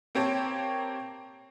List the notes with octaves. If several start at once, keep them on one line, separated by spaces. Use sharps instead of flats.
A#3 C4 G4 C#5 G5 A5